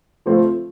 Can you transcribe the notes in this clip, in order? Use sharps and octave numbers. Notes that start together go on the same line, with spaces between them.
F3 A3 C4 F4